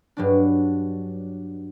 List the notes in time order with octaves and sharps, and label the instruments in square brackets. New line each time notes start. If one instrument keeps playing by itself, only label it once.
[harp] G2 F#3 D4